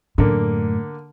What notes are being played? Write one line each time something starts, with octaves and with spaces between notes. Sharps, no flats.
F#2 A2 D3 A#3